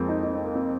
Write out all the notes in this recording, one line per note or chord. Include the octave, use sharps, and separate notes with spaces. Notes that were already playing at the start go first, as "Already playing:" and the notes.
Already playing: F2 F3 G#3 A#3 C4
D#4
D#4
C4
A#3
C4